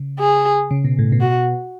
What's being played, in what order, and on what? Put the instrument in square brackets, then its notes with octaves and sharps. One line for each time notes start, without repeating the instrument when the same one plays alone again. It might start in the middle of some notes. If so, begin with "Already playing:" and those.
Already playing: [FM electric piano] C#3
[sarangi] G#4
[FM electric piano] C#3
B2
A2
B2
[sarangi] F#4